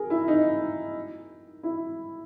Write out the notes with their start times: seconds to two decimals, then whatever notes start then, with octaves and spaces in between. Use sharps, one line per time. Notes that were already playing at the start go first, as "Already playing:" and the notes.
Already playing: G#4 A#4
0.10 E4
0.28 D#4
1.63 E4